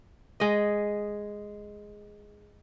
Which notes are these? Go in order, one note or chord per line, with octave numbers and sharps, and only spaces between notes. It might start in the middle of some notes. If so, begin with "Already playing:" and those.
G#3 D#5